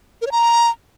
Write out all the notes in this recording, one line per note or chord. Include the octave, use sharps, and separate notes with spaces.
A#4
C#5
A#5